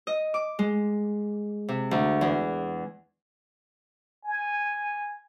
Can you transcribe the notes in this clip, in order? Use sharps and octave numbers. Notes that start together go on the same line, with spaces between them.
D#5
D6
G#3
C3
D2
E2
G#5